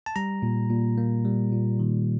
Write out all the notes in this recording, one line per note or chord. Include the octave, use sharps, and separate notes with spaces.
A5
G3 A#5
A#2
A#2
A#3
G3
A#2
D#3